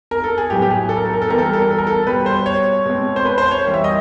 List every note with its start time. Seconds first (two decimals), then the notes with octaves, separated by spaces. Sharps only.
0.11 A#4
0.24 A4
0.38 G#4
0.50 A2 F#3 B3 G4
0.62 G4
0.70 G#4
0.89 A4
0.97 A#4
1.06 A4
1.13 A#4
1.22 A4
1.28 E3 G3 B3 A#4
1.38 A4
1.46 A#4
1.53 A4
1.62 A#4
1.71 A4
1.78 A#4
1.87 A4
2.06 B2 G3 B3 B4
2.26 C5
2.46 C#5
2.86 B2 G#3 C4
3.16 C5
3.25 B4
3.38 C5
3.51 C#5
3.63 E3 G3 A#3
3.74 E5
3.84 D#5